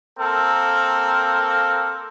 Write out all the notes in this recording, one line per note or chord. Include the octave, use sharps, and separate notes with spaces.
A#3 C4 A4 A#4